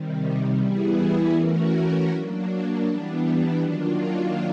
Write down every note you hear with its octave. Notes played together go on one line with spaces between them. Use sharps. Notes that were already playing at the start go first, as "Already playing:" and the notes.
Already playing: C3 D#3 G3
E3 G3 B3 E4 G#4
E3 A3 C#4 F#4 A#4
F#3 A#3 D4
E3 G3 B3 D4
D#3 F#3 A#3 D4 F4